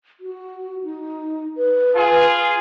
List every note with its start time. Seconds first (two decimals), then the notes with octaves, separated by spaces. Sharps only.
0.20 F#4
0.84 D#4
1.57 B4
1.94 F4 G#4